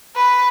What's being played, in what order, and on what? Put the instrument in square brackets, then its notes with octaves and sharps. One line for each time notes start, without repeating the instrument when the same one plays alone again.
[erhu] B4